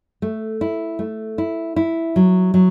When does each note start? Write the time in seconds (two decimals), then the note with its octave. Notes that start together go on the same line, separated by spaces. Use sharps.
0.22 A3
0.61 E4
0.99 A3
1.38 E4
1.76 E4
2.16 F#3
2.54 F#3